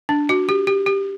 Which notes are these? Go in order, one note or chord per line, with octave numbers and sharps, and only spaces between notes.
D4
F#4
G4
G4
G4